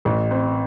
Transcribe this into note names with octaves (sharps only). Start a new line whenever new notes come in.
A1
C4